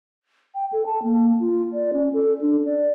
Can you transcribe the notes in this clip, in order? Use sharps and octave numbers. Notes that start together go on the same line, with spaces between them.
G5
A4
A5
A#3
F4
D5
C#4
A4
D4
D5